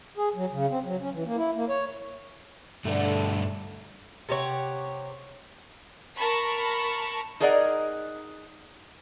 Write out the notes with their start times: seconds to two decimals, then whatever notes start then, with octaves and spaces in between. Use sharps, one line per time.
0.17 G#4
0.36 F#3
0.51 C#3
0.70 C4
0.84 F#3
1.01 C#4
1.13 E3
1.25 A#3
1.37 E4
1.56 A#3
1.69 C#5
2.85 G2 D3 A3
4.29 C3 G4 C#5 F#5
6.17 A#4 A5 B5 C#6
7.40 D#4 G#4 A#4 D5 D#5 F#5